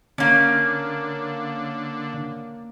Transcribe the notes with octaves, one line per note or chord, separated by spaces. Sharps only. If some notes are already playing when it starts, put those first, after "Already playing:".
D3 A#3 C#4